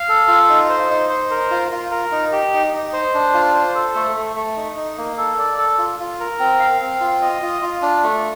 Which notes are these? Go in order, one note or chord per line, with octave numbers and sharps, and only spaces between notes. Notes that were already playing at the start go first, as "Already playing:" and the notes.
Already playing: F5
A4
F4
D#4
C5
D#4
C5
A#4
F4
F4
A#4
D#4
G4
D#4
D#4
C5
D4
F4
C5
A4
A3
A3
A3
D#4
D#4
A#3
A4
D5
A4
F4
F4
A#4
C4
F5
C4
F4
D#5
F4
F4
D4
A3